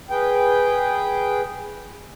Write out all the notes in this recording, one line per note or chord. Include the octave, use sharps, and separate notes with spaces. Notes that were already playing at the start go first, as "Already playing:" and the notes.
G#4 B4 G5